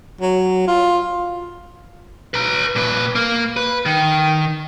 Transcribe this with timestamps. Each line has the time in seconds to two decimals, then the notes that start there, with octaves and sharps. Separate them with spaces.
0.21 F#3
0.67 F4
2.34 B4 A#5
2.76 A#2 B4
3.15 A#3
3.57 B4
3.86 D#3